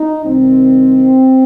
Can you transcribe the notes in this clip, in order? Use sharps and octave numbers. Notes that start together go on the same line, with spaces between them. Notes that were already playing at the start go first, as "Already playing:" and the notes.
Already playing: D#4
C2 C3 D#3 C4